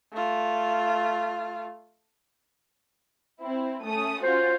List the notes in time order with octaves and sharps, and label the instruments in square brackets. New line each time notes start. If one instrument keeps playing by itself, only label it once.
[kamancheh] A3 F4
[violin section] C4 E4
A3 C#4 D#6
[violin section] C#4 F4 F#4 [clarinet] C5